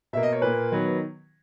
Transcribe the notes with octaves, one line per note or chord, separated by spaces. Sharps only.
B2 A#3 E5
D#5
C#5
A#2 A#3 B4
D#3 F#3 B3